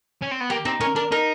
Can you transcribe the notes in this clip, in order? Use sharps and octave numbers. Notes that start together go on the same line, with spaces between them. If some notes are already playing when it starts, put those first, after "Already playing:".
C#4
C4
B3
A#3 G4
C4 D#4
C#4 A#4
D4 A#4
D#4 A#4